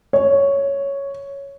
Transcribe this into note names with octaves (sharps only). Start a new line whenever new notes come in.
C#5